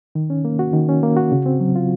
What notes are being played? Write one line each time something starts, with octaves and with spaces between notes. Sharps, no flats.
D#3
C#4
A#3
F#4
D#3
C#4
A#3
F#4
C#3
C4
F#3
F4